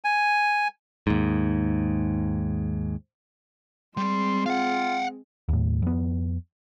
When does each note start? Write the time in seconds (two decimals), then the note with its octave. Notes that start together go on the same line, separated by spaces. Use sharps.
0.04 G#5
1.07 D#2 G#2
3.97 G3 G#3 C4 C6
4.46 F4 F5 F#5
5.49 D#2 A2
5.82 F2 B3